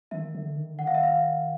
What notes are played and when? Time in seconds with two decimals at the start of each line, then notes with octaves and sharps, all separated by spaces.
0.11 D#3 E5
0.35 D3
0.57 D#3
0.74 D3
0.79 D#3 F#5
0.87 F5
0.94 E5
1.03 F5